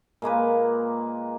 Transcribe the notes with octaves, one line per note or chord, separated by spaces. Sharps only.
A#2 G#3 A#3 B4